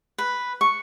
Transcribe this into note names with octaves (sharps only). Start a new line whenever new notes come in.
B4
C#6